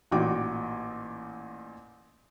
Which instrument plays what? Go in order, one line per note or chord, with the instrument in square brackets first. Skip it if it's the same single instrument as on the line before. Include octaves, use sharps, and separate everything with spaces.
[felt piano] A1 A#2 D#4 F#4 G5 D6